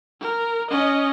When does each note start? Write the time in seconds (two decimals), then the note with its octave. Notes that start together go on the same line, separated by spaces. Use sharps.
0.21 A#4
0.71 C#4 D#5